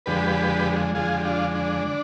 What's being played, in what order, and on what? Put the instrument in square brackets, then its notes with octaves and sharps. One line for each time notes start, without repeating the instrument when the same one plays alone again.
[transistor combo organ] F2 D3 G#3 G4 B4
F2 D3 G#3 F4 G#4
G4
D4 F4
D4
D3